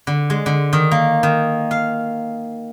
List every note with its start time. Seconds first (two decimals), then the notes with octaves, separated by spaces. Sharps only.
0.07 D3
0.30 G#3
0.46 D3
0.73 D#3
0.91 A#3
1.23 D#3
1.71 F5